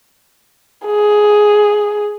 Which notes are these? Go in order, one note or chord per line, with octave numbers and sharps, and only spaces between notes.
G#4